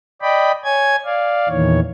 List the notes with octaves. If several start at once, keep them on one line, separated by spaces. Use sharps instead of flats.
D5 D#5 G5 B5
C#5 G#5 G#6
D5 F5
E2 A#2 D#3 E3 C#5